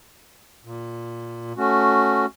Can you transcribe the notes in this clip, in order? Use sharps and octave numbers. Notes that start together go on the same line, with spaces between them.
A#2
A3 C#4 F#4